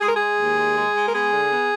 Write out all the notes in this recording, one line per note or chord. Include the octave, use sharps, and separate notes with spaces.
G#3 G#4
A#4
G#4
G#3
D#2
G#3
G#3
G#3
A#4
B3 G#4
D3
B3